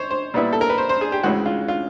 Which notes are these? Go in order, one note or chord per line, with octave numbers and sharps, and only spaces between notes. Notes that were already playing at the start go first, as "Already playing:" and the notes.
Already playing: C5 C#5
C5
A#2 G3 B3 E4
A4
A#4
B4
C5
C5
G#4
G4
C#2 C#3 E3 G#3 F#4
F4
F4